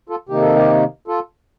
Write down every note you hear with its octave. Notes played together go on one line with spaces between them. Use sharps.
F4 A4
C3 D#3 A#3 D#4 G4
A4
G4
F4 A4